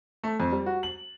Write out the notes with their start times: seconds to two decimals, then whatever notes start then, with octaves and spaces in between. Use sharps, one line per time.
0.24 A3
0.40 F2
0.52 G3
0.66 F#4
0.83 F#7